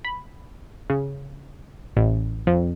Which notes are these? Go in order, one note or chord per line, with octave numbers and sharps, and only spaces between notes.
B5
C#3
A1
F2